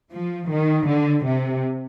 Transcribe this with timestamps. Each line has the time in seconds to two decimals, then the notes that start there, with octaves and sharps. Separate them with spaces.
0.11 F3
0.49 D#3
0.87 D3
1.25 C3